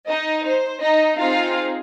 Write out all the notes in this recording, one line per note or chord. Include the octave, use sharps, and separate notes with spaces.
D#4 D#5
C5
D#4 D#5
C4 D#4 F4 G#4 F5